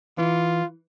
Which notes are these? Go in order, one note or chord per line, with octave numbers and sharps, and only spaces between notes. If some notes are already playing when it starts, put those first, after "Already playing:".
E3 F4